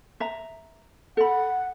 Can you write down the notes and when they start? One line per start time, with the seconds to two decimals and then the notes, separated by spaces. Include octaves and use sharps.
0.20 E5 A#5
1.17 A4 F#5 B5